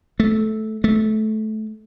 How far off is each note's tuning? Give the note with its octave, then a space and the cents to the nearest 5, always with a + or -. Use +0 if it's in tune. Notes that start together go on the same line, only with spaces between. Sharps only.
A3 -15
A3 -20